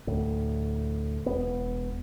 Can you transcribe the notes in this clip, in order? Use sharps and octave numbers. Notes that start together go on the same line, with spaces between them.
D2 A2
E1 B3